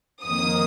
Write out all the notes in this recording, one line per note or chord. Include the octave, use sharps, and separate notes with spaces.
F2 D#3 A#3 D#6